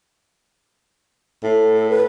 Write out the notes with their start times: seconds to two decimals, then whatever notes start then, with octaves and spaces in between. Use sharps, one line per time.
1.43 A2
1.76 A4
1.89 B4